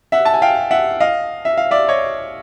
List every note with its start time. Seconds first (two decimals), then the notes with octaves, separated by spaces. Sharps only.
0.12 E5 F#5
0.25 A5
0.34 G#5
0.42 F5 G5
0.71 E5 F#5
1.00 D#5 F5
1.45 E5
1.57 F5
1.71 D5 E5
1.88 C#5 D#5